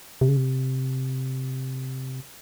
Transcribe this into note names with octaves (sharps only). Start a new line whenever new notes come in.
C3
C#3
C3